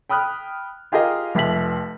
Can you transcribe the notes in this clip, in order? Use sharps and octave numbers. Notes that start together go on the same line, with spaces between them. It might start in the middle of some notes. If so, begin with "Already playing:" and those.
G5 B5 D#6 F6 F#6
F4 G4 G#4 A#4 D#5 F5
F1 F2 E5 B6 F#7